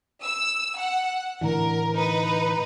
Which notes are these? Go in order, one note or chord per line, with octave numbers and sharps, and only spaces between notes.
E6
F#5
A2 D3 E3 A#4
D#4 B4 A#5